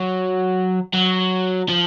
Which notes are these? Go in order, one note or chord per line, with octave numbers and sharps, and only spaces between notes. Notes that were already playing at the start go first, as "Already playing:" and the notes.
Already playing: F#3
F#3
F3